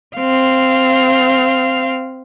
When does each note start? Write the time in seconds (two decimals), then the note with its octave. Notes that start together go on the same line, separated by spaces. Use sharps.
0.16 C4 F5